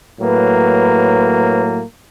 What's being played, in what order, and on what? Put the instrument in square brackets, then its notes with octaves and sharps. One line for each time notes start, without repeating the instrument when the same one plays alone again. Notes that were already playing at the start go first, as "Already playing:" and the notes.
[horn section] A2 F#3 A#3 [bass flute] B4